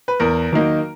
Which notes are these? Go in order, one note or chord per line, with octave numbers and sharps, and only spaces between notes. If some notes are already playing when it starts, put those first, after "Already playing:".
B4
E2 A#4
D#3 F#3 A#3 D#4